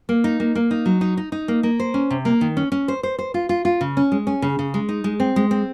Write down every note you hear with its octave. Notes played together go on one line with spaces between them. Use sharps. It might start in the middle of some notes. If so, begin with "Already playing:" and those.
A#3
D#4
A#3
A#3
D#4
F#3
D#4
D#4
D#4
A#3
A#3
C5
C#4
C3
A#3
D#3
C#4
C#4
C5
C5
C5
F4
F4
F4
C#3
C#4
G#3
C#4
C#3
C#3
G#3
D#4
G#3
C4
G#3
C4